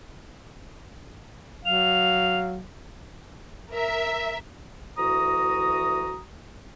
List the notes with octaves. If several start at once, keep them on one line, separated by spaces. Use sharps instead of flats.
F#3 F5 F7
A#4 E5
D2 E3 F#4 A#5 D#6